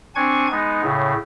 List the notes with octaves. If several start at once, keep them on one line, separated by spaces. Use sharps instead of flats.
C4 D4 G#5 C#6 G#6
G#3 B3 D#4
A2 C#3